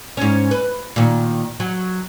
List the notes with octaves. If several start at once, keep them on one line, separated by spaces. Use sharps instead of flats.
G#2 C#4
B4
A#2 D#3
F#3